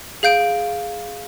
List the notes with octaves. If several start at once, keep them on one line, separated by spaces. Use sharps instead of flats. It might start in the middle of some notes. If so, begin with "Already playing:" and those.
G#4 F5 G6 D7